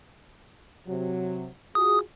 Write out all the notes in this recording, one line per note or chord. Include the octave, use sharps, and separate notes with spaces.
C3 F#3
F4 F#4 G#4 D#6